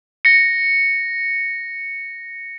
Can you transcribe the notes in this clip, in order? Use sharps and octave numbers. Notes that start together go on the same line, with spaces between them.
A#6 C#7